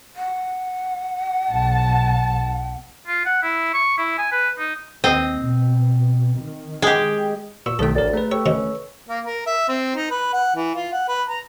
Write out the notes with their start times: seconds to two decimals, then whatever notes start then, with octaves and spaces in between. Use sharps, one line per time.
0.16 F#5
1.50 B1 A5
3.07 F4
3.25 F#5
3.43 E4
3.74 C#6
3.98 E4
4.18 G#5
4.32 B4
4.58 D#4
5.04 D#2 C4 D#5
5.40 B2
6.38 D#3
6.82 G#3 G4
7.66 A#2 C#6 E6
7.79 B1 D#3 A3 A4 G5 D#6
7.95 A1 D2 A#4 C#5 D5 A6
8.14 A3 G#4 B4 A#5
8.31 G4 A4 C#5 C#6 E6
8.46 C3 D#3 C#4 D#4
9.09 A#3
9.26 A#4
9.47 E5
9.68 C4
9.95 D#4
10.10 B4
10.33 F#5
10.56 E3
10.75 F4
10.93 F#5
11.08 B4
11.29 A#5